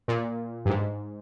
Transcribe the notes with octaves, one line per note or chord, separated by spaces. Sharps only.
A#2
G2
G#2